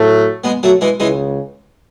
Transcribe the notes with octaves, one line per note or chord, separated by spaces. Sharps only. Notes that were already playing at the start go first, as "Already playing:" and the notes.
Already playing: A2 F#3 A3
G#3 B3
F#3 A3
E3 G#3
C#2 C#3 E3 G#3